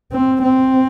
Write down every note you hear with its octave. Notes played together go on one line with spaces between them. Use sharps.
C4
C4